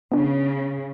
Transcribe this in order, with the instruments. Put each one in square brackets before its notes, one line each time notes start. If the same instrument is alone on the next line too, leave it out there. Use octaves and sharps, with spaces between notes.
[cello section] C#3 [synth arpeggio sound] B3 D4